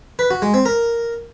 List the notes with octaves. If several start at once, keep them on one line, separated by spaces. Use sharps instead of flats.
B4
F#4
G#3
C4
A#4